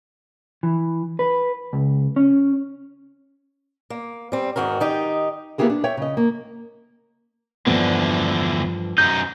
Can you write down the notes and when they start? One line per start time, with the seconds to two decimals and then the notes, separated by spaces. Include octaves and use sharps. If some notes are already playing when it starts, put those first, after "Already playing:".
0.63 E3
1.19 B4
1.73 C#2
2.16 C#4
3.90 A#3
4.32 G3 C4
4.56 E2 G#2 D#3 F#4 A#4
4.80 D#3 D#4 G4
5.58 A#3 B3 E4 G4 G#4 A#4
5.70 D4
5.84 C#5 E5 G5
5.97 C#3 D#5
6.17 A#3
7.67 E2 G2 D3 F3 B3
8.98 F#2 D#4 G6